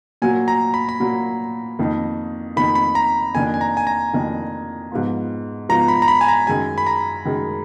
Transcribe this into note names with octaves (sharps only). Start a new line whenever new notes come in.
A#2 F#3 A#3 G#5
A#5
B5
B5
A#2 F#3 A#3
F2 D#3 A#3 D#4
F2 D#3 A#3 D#4 B5
B5
A#5
F2 D#3 A#3 D4 G#5
G#5
A#5
G#5
A#5
F2 D#3 A#3 D4
G#2 F3 B3 F4
G#2 F3 B3 F4 A#5
B5
A#5
B5
G#5
A#5
F#2 D#3 G#3 G#5
B5
A#5
F#2 D#3 G#3